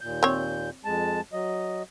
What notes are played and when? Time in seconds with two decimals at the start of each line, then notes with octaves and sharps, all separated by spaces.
0.01 D#2 A#2 G6
0.23 C4 C#5
0.85 F2 G#3 A5
1.33 F#3 D#5